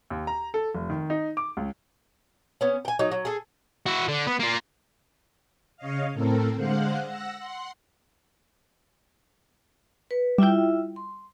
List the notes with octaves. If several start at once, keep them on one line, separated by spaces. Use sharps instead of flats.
D#2
A#5
A4
F1
D#3
D#4
D6
C#2
B3 C#4
G5 G#5
F#3 D#4
F#3
G#4 A4
E4 F#4
D3
B3
A#3 F4
C#3 C#5 D#5 F5
A2 C4 A4 A#4
D3 G#3 C5 F5 F#5 F#6
F#5 E6 A#6
F#5 C6
B4
G3 E4 F4 E5 G5
C6